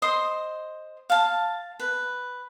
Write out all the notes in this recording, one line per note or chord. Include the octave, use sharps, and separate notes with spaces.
C5 D#5 C6
F5 A5
B4